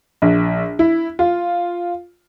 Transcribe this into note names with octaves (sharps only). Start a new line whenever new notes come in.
A#1
E4
F4